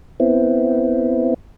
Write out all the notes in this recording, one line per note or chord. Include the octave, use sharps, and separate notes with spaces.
B3 C4 E4